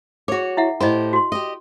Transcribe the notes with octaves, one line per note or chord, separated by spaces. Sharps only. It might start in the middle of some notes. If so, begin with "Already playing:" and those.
F#4 G#4 C#5 D6
E4 E5 F#5
A2 G4 C5 D#5 B5
F#4 C6
G4 D#5